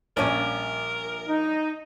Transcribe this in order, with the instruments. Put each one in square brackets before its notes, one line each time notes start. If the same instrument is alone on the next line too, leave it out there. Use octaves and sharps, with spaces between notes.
[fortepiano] A#1 C#4 G#5 [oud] F3 G3 D5 [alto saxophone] A#4
[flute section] D#4